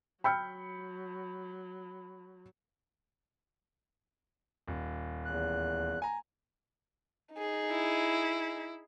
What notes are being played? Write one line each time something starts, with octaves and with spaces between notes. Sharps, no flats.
F#3 G5 B5 E6 F6 G6 C#7
D#1
E2 F#6
G#5 A#5
D#4 G#4
E4